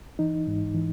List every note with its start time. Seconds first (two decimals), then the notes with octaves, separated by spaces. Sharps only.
0.19 E3 D#4
0.47 G#2
0.75 E3